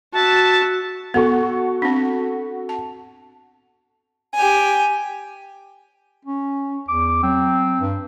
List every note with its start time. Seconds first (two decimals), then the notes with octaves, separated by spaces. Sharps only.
0.13 F#4 E5 A5
1.14 B3 F#4 A4 C#6
1.82 C4 D4
2.69 A5
4.35 G4 G#5
6.25 C#4
6.89 E2 D6
7.23 F#3 C4
7.81 G2